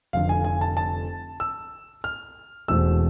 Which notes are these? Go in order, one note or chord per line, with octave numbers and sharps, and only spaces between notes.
F1 F2 D3 F5
G#5
G#5
A5
A5
E6
F6
E1 E2 B2 A3 C4 E6